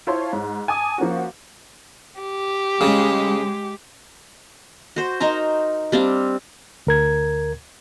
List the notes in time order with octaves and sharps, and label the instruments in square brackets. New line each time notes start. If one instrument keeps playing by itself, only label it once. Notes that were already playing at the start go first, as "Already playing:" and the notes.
[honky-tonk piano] E4 F4 C5 C#5 A5 C6
G#2
G#5 A5 D6 D#6
F3 A#3 C#4 F#4
[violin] G4
[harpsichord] C#3 [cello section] G#3
[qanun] F#4 C5
D#4 A#4 C5 A#5
G3 C4 D4 F5
[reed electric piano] D2 A#4 G#6